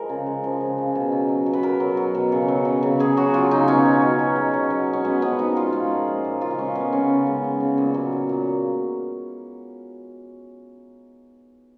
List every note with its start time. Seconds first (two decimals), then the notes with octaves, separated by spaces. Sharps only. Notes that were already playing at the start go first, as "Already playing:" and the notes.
Already playing: F3 G#3 A#4
0.09 C#3
0.26 G#3
0.44 F3
0.61 C#3
0.78 C#3
0.95 B2
1.12 F#3
1.29 F#3
1.46 B2
1.53 B4
1.63 B2 A#4
1.80 F#3
1.97 F#3
2.15 B2
2.32 C#3
2.48 F#3
2.65 F#3
2.83 C#3
2.99 C#3 G#4
3.17 F#3 F#4
3.34 F#3 F4
3.51 C#3 D#4
3.67 B2 C#4
3.85 F#3
4.02 F#3
4.19 B2
4.36 B2
4.54 F#3
4.70 F#3
4.87 B2
4.93 C#4
5.04 G#3 B3
5.22 F3 B3
5.39 A#2 D#4
5.56 A#2 F4
5.72 G#3 F4
5.91 F3
6.08 A#2
6.25 A#2
6.41 C#3 F4
6.51 D#4
6.58 G#3 C#4
6.75 G#3 B3
6.93 C#3 C#4
7.10 C#3
7.27 G#3
7.44 G#3
7.60 C#3
7.78 A#2
7.94 F#3
8.12 F#3
8.29 A#2